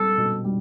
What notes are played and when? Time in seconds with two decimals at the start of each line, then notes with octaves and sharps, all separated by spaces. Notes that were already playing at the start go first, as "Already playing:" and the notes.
Already playing: G3 C4 A4
0.18 B2
0.44 G3